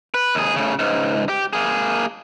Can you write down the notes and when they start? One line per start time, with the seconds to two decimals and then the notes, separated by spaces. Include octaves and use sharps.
0.14 B4
0.35 D#2 G#4
0.56 A2 C#3
0.79 C#2 G#2
1.29 G4
1.53 A#3 G#4